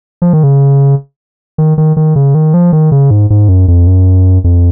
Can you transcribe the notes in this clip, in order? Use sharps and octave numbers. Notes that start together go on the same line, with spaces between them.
F3
D#3
C#3
D#3
D#3
D#3
C#3
D#3
F3
D#3
C#3
G#2
G#2
F#2
F2
F#2
F2